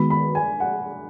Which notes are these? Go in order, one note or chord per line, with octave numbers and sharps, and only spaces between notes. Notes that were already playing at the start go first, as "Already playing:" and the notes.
Already playing: D#3 G#3 B3 F#4 B4 B5
B5
G#5
F#5